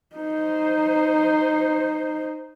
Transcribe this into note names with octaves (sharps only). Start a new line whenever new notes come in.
D#4 C5